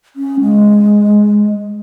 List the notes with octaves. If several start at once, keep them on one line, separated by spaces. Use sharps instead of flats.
C#4
G#3